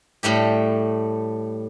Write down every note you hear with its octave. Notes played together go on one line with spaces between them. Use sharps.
A2 G3 A3 G4